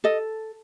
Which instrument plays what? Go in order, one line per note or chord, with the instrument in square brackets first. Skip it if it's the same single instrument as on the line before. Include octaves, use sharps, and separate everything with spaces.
[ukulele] A4 D#5